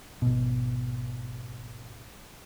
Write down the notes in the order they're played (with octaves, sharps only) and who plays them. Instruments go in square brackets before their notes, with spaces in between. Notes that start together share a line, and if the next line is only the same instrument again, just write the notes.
[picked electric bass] G#1 B2